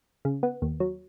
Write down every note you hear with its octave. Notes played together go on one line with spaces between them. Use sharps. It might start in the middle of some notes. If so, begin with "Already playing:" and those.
C#3
B3
D#2
F#3